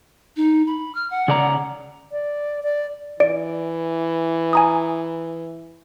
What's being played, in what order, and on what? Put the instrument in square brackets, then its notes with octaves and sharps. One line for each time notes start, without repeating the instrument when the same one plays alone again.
[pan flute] D#4
B5
F6
F#5
[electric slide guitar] C#3 D5 A#5
[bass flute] D5
D5
[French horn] E3 [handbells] D5 D7
[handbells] G#5 A#5 D#6